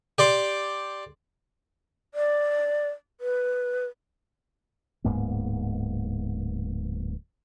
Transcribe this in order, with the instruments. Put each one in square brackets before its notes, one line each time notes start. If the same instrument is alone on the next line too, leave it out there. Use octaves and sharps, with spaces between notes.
[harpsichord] G4 D5 C6 D6
[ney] D5
B4
[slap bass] D1 G#2 A#3 B3